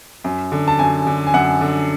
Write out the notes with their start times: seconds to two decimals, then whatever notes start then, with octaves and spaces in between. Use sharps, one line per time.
0.24 F#2
0.52 D3
0.68 A5
0.79 F#2 G#5
1.07 D3
1.27 G#5
1.34 F#2 F#5
1.61 D3